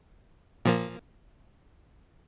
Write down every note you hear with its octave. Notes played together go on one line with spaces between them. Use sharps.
A#2 F3 A#3